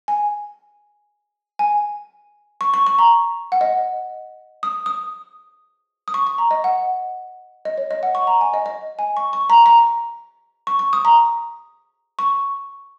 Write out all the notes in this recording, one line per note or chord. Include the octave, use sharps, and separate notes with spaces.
G#5
G#5
C#6
C#6
C#6
A#5
F#5
D#5
D#6
D#6
D#6
C#6
C#6
A#5
D#5
F#5
D#5
C#5
D#5
F#5
C#6
A#5
G#5
D#5
D#5
G#5
C#6
C#6
A#5
A#5
C#6
C#6
D#6
A#5
C#6